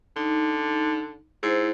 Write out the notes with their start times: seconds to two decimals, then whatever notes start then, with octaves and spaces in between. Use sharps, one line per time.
0.17 D3 D#4
1.43 G#2 E4 C5